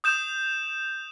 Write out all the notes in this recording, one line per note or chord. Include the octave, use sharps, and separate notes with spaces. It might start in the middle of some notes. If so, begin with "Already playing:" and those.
D#6 G6 E7